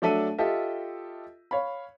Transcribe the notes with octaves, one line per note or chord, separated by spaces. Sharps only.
F#3 A3 D4 A4 E5 D#7
F4 G4 A4 D#5 E5
C#5 F5 B5